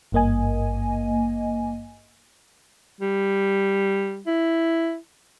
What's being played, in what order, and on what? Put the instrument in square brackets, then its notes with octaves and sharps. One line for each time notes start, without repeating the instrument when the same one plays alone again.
[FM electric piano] G#1 G2 A#3 D#5 G#5
[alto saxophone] G3
E4